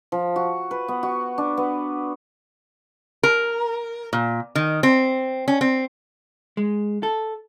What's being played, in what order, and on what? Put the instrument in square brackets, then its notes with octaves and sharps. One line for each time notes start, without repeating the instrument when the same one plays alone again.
[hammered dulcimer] F3
F#4
B4
B3
F#4
D4
B3
[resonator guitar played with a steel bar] A#4
A#2
D#3
C4
C#4
C4
[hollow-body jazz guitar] G#3
A4